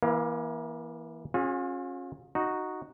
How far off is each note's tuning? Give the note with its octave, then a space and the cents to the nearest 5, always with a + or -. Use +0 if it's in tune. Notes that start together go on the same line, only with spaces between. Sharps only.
E3 +0 A#3 +35 F5 +0
C#4 -30 F4 +40 G#4 +0
D#4 -5 F#4 +0